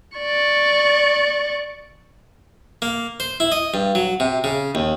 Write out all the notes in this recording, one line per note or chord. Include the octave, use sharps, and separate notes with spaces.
D5 C#6
A#3
C5
E4
D#5
G2
F#3
C3
C#3
D#2